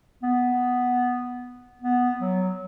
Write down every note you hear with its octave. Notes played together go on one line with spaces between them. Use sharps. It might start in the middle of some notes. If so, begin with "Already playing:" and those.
B3
B3
F#3